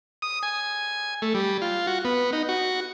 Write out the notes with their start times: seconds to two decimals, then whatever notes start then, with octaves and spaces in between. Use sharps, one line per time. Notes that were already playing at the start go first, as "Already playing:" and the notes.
0.22 D#6
0.43 G#5
1.22 A3
1.35 G3
1.62 F4
1.87 F#4
2.05 B3
2.33 D#4
2.49 F#4